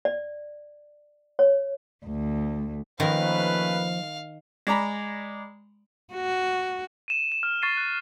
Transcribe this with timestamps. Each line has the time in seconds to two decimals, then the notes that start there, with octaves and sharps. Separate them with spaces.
0.05 D5
1.39 C#5
2.06 D2
3.00 D#3 F3 A3 A#3 C#4 B4 F5
4.67 G#3 D5 A#5 B5
6.14 F#4
7.08 D#7 E7
7.32 E7
7.43 F6
7.62 C#6 A6 C7 D#7
7.77 F#6